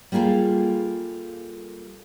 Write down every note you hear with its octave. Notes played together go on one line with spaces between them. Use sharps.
G3 A#3 F4 G#4 A4